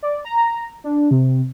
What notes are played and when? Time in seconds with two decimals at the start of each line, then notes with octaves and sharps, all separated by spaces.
0.03 D5
0.25 A#5
0.84 D4
1.11 C3